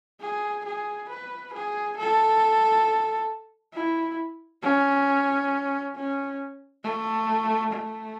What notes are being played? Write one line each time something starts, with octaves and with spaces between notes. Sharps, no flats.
G#4
G#4
B4
G#4
A4
E4
C#4
C#4
A3
A3